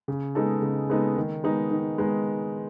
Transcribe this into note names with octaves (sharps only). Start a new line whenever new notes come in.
C#3
G#3 B3 D#4 A4
C#3
G#3 B3 D#4 A4
D#3
G#3 B3 D#4
D#3
G#3 B3 D#4